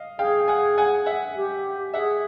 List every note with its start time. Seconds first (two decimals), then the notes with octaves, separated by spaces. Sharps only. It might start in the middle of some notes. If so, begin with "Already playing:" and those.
Already playing: D#5 F5
0.19 G#4 F5 G5
0.48 F#5 G#5
0.78 F#5 G#5
1.06 E5 F#5
1.36 G4
1.94 G#4 E5 F#5